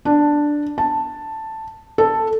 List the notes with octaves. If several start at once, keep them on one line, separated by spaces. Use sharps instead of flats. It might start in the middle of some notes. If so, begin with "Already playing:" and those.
D4
A5
A4